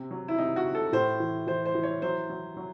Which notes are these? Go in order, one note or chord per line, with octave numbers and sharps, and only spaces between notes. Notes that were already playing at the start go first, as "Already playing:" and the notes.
Already playing: C3
F#3
E4
C3 D#4
F#4
C3
A4
A2 C5
E3
E3 C5
C5
E3
C#5
F#3 C5
F#3
F#3